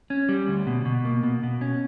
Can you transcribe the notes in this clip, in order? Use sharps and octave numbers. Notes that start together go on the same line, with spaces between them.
C#4
G3
D2
B2
B2
A#3
B2
B2
C#4